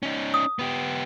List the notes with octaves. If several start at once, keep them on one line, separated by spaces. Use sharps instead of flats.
C#4 D#4
D#6
B3 G4